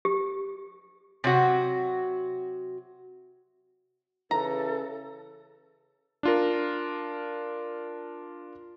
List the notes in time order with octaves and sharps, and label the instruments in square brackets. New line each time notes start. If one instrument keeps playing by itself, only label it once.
[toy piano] G4
[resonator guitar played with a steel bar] C3 F#3 F#4
[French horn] C#3 [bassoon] E3 [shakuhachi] A4 [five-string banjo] A#5
[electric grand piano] D4 F4 A#4